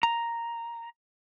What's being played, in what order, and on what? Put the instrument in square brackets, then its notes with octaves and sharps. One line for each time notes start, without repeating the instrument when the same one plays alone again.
[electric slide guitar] A#5